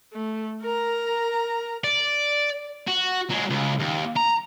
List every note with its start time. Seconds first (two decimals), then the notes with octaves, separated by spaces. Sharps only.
0.13 A3
0.62 A#4 A#5
1.84 D5
2.87 F#4
3.29 F#3 G#3
3.50 C#2
3.79 D#2
4.16 A#5